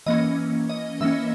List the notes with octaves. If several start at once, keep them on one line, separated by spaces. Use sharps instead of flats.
E3 A#3 C#4 D#5
D#5
E3 A#3 C#4 E5